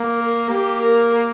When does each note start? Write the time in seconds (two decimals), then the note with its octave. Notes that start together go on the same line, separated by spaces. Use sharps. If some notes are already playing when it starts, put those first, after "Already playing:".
Already playing: A#3
0.19 A#4
0.50 A#3 G4
0.81 A#4